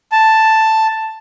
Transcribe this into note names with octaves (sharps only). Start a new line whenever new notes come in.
A5